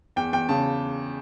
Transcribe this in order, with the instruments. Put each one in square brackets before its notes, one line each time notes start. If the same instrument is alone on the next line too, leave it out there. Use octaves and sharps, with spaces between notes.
[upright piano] E2 G5
E2 G5
C#3 A5